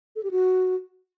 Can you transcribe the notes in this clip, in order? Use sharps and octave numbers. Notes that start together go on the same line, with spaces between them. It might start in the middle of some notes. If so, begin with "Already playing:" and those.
A4
G4
F#4